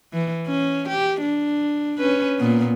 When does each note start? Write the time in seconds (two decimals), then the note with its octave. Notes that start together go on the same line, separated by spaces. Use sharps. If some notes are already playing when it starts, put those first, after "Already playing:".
0.13 E3
0.47 C#4
0.89 G4
1.21 D4
1.98 C#4 B4
2.38 A#2 B3